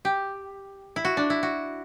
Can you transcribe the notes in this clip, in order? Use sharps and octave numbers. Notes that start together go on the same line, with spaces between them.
G4
E4
F#4
D4
E4
F#4